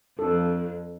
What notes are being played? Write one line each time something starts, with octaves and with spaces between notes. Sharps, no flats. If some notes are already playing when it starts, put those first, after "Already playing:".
F2 A4